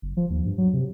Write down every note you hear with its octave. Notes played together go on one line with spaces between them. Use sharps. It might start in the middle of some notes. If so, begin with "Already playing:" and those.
F#1
F3
D#2
G2
F#3
C3